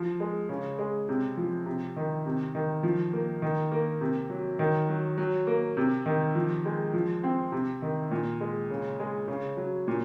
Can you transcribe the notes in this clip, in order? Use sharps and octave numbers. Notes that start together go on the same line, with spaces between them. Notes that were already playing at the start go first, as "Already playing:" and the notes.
Already playing: F3
G#3
C#3
G#3
C3
F3
C3
D#3
C3
D#3
F3
A#3
D#3
A#3
C3
F#3
D#3
F#3
F#3
A#3
C3
D#3
F3
G#3
F3
C4
C3
D#3
A#2
G#3
C#3
G#3
C#3
F#3
A#2